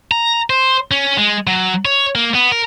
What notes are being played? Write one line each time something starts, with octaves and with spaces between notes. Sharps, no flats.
A#5
C5
C#4
G#3
F#3
C#5
A#3
B3
A#4